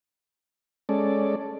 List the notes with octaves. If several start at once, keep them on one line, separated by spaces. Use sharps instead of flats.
G#3 C#4 A4 D5